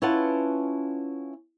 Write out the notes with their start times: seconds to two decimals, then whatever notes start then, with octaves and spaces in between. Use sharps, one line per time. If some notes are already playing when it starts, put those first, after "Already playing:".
0.02 C#4 E4 F4 B4 F#5 A5